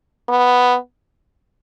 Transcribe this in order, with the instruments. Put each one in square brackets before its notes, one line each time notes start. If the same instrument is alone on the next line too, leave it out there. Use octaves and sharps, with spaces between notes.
[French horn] B3